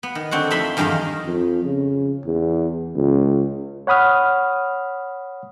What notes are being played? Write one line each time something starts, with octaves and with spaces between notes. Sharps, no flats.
B3
D#3
D3 C4 F#4 F#5
F2 A3 D#4 E5 B5 C6
E2 G2 D#3 D#4 A#4 F5
F2
C#3
E2
C#2
C#5 F#5 B5 D#6 F6